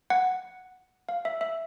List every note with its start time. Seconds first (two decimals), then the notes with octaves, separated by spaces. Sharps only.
0.10 F#5
1.09 F5
1.25 E5
1.41 E5